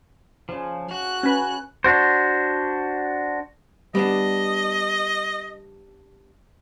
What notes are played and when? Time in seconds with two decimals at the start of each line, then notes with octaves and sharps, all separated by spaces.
0.49 C#3 F3 A5
0.91 F#4 F#6
1.23 C#4 B4 G#5 A#5
1.84 D4 F#4 C5
3.95 G3 B3 D4 D#5